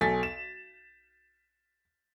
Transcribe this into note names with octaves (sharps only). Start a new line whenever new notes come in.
B1 A4 G#5 A6 B6
E7